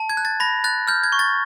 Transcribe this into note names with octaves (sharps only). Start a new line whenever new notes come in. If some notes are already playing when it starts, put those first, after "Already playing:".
Already playing: A5
G#6
F#6
A6
B5 A#6
F#6 A6
F6 G6
G#6
C#6
A6